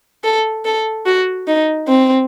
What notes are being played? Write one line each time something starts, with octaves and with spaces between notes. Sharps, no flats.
A4
A4
F#4
D#4
C4